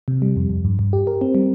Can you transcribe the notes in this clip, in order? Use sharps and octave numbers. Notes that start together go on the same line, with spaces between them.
C3
G3
F2
F2
G2
G2
G4
A#4
C4
G3